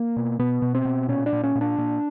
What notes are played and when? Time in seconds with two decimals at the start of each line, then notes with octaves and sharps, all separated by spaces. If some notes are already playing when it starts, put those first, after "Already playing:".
Already playing: A#3
0.16 B2
0.39 B2 B3
0.62 B2
0.75 C4
0.85 B2
1.09 A#2 C#4
1.26 D4
1.33 A#2
1.44 C#4
1.55 A#2
1.61 D4
1.78 A#2